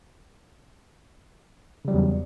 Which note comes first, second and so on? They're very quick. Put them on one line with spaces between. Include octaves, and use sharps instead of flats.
C#3 G3 F#3 E2